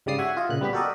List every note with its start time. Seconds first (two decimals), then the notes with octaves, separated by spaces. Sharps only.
0.06 G#2 C#3 G3 D5 D#6 C7
0.18 F#4 E5 F#5 G#5
0.37 F4 D#5
0.49 A#2 C#3 F#6
0.61 G3 B3 G4 B5
0.73 F#4 G4 A4 A#4 D5 D#5